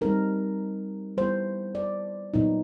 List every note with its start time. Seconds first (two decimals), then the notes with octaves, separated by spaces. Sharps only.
0.01 G3 C4 D#4 A#4
1.17 G3 B3 E4 C5
1.75 D5
2.34 A#2 F#3 B3 D#4